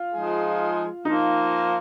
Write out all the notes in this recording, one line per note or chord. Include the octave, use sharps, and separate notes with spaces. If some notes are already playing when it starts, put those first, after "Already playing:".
Already playing: F4
F3 G#3 D#4 G#4
F3 A#3 D#4